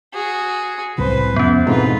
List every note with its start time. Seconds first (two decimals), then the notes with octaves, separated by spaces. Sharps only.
0.13 F#4 G#4
0.98 C2 A2 C#3 B4 C5
1.36 F2 B3 C#4
1.67 F2 G#2 B2 E3 D#4 F4 B4